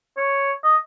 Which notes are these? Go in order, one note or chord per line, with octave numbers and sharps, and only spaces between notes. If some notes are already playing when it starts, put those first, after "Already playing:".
C#5
D#5